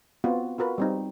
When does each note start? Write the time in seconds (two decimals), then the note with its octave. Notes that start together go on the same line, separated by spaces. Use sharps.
0.24 B3 C4 F4 F#4
0.58 F4 F#4 A#4 B4
0.78 G3 C4 D#4